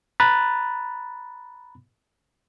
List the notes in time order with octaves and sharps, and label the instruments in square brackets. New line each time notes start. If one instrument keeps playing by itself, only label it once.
[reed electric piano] A#5 B5 F#6 A6